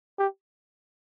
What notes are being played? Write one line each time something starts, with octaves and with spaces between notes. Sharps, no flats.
G4